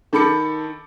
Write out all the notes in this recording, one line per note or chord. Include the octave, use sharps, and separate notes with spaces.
D#3 A4 B5 D6 C#7